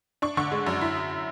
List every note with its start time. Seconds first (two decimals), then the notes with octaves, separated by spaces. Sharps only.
0.22 D4 C#6
0.37 D3 C#6
0.52 G#3
0.66 F#2
0.81 E4